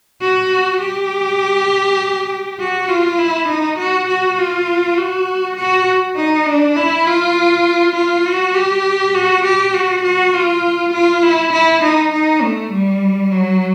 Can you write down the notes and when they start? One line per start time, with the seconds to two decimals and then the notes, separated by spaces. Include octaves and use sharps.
0.21 F#4
0.81 G4
2.59 F#4
2.89 F4
3.18 E4
3.48 D#4
3.78 F#4
4.08 F#4
4.38 F4
4.97 F#4
5.56 F#4
6.16 D#4
6.46 D4
6.76 E4
7.06 F4
7.95 F4
8.26 F#4
8.54 G4
9.14 F#4
9.44 G4
9.74 F#4
10.04 F#4
10.34 F4
10.93 F4
11.23 E4
11.53 E4
11.83 D#4
12.12 D#4
12.41 A3
12.72 G3
13.31 F#3